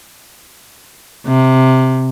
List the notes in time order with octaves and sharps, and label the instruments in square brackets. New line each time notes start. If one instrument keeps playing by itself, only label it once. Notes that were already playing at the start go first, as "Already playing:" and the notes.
[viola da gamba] C3